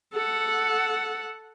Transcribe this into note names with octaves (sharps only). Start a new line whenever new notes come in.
A4 F#5